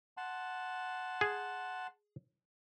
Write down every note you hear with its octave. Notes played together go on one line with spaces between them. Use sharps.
F#5 A5 C6
G#4